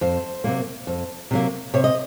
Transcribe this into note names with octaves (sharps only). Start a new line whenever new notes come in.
F2 C5
C3 F#3 A#3
F2
C3 F#3 A#3
C3 C#5
D#5